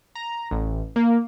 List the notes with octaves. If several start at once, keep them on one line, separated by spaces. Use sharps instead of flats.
A#5
A1
A#3